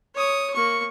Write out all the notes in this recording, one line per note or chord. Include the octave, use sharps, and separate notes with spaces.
C#5 D#6
A#3 C#6